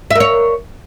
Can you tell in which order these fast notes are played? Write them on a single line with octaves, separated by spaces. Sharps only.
E5 A#4 C#5